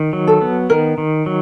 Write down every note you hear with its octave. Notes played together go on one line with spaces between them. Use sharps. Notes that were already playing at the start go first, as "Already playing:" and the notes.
Already playing: D#3
F#3
A4
B3
D#3 A#4
D#3
F#3